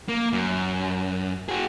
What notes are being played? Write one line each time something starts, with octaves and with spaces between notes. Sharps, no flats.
A#3
F#2
F#4 G#4